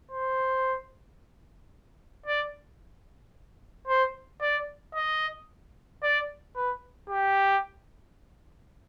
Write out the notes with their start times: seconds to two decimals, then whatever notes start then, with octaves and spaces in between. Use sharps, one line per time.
0.12 C5
2.26 D5
3.88 C5
4.41 D5
4.95 D#5
6.03 D5
6.56 B4
7.10 G4